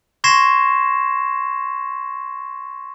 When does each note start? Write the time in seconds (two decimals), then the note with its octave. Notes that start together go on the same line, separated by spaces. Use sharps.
0.24 C6 C#6 G#6 A#6 C7 E7